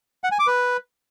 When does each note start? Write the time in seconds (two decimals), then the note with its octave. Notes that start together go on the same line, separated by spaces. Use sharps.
0.24 F#5
0.32 G#5
0.39 D6
0.47 B4